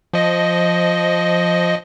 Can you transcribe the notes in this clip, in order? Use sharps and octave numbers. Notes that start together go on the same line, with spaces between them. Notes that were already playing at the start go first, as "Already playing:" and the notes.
F3 D#5